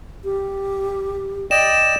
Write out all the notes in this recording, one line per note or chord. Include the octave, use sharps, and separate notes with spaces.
G4
D5 D#5 G5 E7